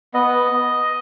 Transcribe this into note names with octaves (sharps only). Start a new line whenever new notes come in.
B3 D#5